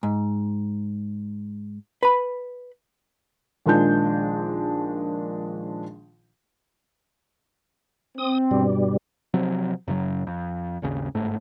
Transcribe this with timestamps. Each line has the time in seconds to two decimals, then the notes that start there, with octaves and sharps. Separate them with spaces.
0.03 G#2
2.03 B4 B5
3.66 A#1 D#3 F3 G#3 D4 G6
8.18 C4 D#6
8.51 G2 B2 G3
9.34 C3 F3 F#3 C4
9.88 F#2 C#3 F#3
10.27 F2
10.82 G#1 D#2 C#3
11.15 G1 G#2 A3